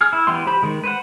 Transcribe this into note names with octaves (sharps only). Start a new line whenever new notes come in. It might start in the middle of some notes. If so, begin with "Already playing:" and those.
G#4 F6
E4
E3 G3 B3 C6
G4 C5 B5
D#3 G#3
B4 C5 F#5